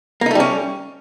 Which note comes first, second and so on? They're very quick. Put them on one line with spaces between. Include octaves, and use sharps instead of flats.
A#3 D#4 A3 G3 C#4